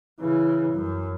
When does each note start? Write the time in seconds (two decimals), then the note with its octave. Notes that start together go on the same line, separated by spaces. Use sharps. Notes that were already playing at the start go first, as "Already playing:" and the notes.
0.20 C#3 E3
0.72 F#2